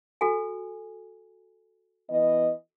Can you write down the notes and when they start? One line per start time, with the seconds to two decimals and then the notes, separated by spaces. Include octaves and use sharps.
0.21 F#4 A4 G#5
2.10 E3 B3 D#5